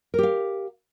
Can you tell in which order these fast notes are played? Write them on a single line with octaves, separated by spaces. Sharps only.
A#4 G4 F5